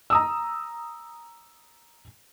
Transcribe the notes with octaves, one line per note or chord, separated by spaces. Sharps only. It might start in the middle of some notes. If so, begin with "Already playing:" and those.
A#5 D#6 E6